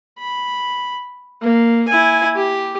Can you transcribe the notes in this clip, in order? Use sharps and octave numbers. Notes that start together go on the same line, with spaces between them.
B5
A#3
E4 G#5
G4